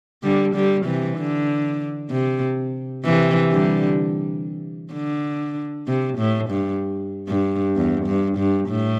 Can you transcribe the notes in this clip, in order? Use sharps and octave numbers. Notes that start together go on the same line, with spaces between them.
D3 G3
D3 G3
C3 E3
D3
C3
C3 E3
D3 G3
D3
C3
A2
G2
G2
E2
G2
G2
A2